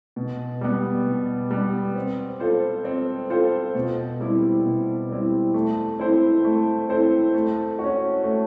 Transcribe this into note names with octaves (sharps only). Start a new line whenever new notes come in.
B2
G3 B3
B2
G3 B3
C4
F4 A4 C5
C4
F4 A4 C5
B2
G3 C4 E4
B2
G3 C4 E4
A3
C4 E4 A4 C5
A3
C4 E4 A4 C5
A3
F#4
C#4
A3